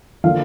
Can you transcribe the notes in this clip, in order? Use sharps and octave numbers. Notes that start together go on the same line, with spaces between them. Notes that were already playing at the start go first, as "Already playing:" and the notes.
D3 F3 A#3 D4 F5